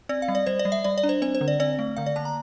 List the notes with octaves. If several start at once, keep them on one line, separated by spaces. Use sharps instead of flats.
C4 D5
F5
G3
D5
G3 C5
D5
G3
E5
G3 D5
D5
D4
C5
C4 C5
C5
D3
D5
C4 D5
A3
D3 F5
D5
A#3 A5
A#5